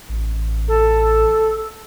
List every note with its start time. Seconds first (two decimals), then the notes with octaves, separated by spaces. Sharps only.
0.09 A1
0.68 A4